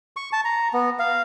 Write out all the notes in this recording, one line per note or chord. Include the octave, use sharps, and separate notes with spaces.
C#6
A5
A#5
B3
F5